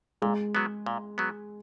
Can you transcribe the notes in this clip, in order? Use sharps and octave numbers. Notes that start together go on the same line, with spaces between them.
A#2 G#3
F#3 B3
A#2
F#3 B3